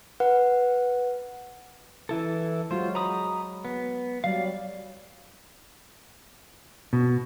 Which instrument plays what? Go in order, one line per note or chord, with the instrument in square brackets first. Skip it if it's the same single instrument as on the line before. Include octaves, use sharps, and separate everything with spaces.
[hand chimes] B4 F#5
[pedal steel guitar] E3 E4 A4
[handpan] F#3 G#3 F#4 [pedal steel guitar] F4 C5
[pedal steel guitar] A#5 B5 D#6
B3
[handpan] F#3 G3 [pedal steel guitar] D5 F5
[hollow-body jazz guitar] B2